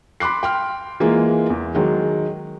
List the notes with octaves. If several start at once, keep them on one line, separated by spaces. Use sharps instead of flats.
B5 C6 D6 F#6 C7
G5 C6 F6
E3 G#3 A#3 F4
E2
D#3 F#3 G#3